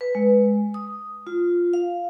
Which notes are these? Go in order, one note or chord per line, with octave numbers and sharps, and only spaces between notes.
B4
G#3
D#6
F4
F5